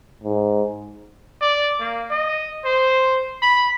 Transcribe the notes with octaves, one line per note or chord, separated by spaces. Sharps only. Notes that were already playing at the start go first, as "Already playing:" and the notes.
G#2
D5
A#3
D#5
C5
B5